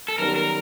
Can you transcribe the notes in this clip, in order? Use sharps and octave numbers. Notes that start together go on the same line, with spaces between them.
A4
F#2 D#3 G3 B3 A#4
A#4